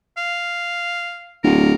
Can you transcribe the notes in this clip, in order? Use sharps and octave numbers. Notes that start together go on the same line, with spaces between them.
F5
D1 A#4